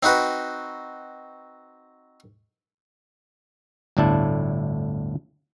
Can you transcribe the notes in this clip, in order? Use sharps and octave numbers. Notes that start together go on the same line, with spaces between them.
C4 D#4 F#4 B4
G1 D2 A2 D4 E4 A5